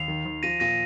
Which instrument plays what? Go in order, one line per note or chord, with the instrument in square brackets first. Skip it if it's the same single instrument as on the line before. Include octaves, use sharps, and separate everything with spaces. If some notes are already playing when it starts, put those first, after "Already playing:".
Already playing: [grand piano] D#2 [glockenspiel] C7 F7
[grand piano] D#3
D#2
[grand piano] F3 [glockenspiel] A#6 D#7
[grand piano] A#2 [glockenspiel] A#6 D#7